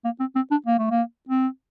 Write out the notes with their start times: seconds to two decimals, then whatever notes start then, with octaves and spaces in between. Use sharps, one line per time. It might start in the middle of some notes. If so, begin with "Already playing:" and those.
0.05 A#3
0.20 C4
0.36 C4
0.51 D4
0.67 A#3
0.79 A3
0.91 A#3
1.29 C4